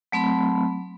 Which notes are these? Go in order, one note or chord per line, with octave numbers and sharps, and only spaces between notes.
F#3 A3 C4 B5